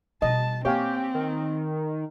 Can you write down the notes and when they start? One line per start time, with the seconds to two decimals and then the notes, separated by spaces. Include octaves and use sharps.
0.22 B2 G3 D#5 A5
0.65 A#3 C4 G4 C#5 F5 G#5
1.14 D#3